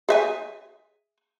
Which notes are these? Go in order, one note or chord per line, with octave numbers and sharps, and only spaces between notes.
G#4 E5 G#5